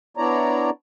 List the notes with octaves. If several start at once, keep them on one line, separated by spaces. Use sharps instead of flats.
B3 D4 E4 C#5 D5 A#5